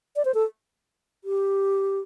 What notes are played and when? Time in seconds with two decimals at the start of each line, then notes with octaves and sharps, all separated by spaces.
0.16 D5
0.25 C5
0.34 A4
1.24 G4